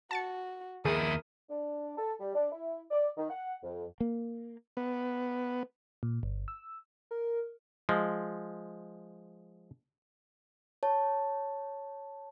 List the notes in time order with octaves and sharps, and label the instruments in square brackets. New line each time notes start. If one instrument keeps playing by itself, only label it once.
[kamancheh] F#4 [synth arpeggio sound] A5 A6 C#7
[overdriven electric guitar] D#2 E4 [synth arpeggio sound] G#4 [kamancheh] A#4 D#6
[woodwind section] D4
A4
G3
D4
E4
D5
D#3
F#5
F2
[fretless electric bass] A#3
[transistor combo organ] B3
[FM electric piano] A#2
G1
E6
[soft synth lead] A#4
[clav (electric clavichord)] F3 G#3
[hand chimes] C#5 A5